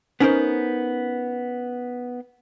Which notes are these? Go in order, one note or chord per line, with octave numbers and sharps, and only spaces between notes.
B3 C#4 D#4 G4 A#4 C5